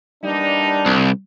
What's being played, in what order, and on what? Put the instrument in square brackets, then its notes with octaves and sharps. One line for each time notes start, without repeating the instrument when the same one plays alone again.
[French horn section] E3 A#3 D#4 [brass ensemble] G3 D4
[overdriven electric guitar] C2